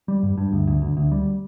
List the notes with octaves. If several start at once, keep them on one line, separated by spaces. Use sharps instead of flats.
G3
G2
G2
D2
D2
D2
D2
G3